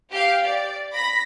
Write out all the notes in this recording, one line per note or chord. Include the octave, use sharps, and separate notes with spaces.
G4 F5
D5
B5 A#6 B6